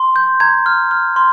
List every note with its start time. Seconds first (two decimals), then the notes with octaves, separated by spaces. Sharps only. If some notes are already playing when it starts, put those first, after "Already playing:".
Already playing: C6
0.16 G6
0.40 A#5 G#6
0.66 F6
0.91 F6
1.16 C6